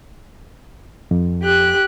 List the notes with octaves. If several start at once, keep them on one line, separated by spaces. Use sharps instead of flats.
F2
G4 F#6